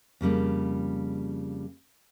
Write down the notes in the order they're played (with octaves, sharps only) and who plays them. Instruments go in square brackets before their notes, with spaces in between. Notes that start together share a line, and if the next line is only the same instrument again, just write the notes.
[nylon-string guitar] F2 C#3 G3 A#3